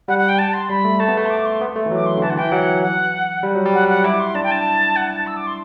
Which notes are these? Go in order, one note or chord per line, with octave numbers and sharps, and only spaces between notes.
G3 F#5
F#5
G5
A5
C6
G3 B5
A3
A3 A5
B3
A3
C6
D6
C6
B3
A3
E3
F#3 D6
C6
D3
E3 A5
F#5
E3 G5
F#3 F#5
F#5
G3
F#3
G3
F#5
F#5
E4 D6
C6
D4 A5
G5
A5
F#5
A5
E6
D6
C6